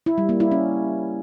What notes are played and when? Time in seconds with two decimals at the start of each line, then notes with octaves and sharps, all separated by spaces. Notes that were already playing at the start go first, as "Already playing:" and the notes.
0.06 E4
0.18 G3
0.29 A#3
0.40 E4
0.51 C#4